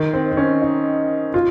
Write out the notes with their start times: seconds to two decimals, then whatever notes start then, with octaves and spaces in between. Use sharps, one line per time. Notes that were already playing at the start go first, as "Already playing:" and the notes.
Already playing: D#3
0.13 C4
0.31 C4
0.37 C#4
0.62 D#4
1.34 F4